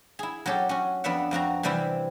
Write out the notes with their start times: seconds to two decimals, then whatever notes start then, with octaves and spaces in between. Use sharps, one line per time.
0.19 E4 G#4
0.46 F#3 C#4 G4 A4
0.69 C#4 F#4
1.04 F2 B3 D4 E5 F#5
1.31 F2 C4 F#4 A#5
1.63 C3 E3 G3 C4 E4